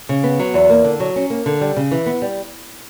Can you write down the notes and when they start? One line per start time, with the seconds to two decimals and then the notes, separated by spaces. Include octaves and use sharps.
0.09 C#3
0.24 B3
0.39 F#3
0.54 E2
0.70 A#3
0.84 D3
1.00 F#3
1.16 C#4
1.30 A#3
1.46 D3
1.61 G3
1.77 C#3
1.91 E3
2.06 B3
2.22 G3